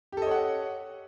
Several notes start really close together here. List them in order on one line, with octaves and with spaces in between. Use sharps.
G4 A4 D#5 C#5 F#5